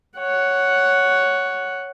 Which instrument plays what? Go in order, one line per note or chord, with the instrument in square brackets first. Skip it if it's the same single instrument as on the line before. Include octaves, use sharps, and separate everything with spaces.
[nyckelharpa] C#5 F#5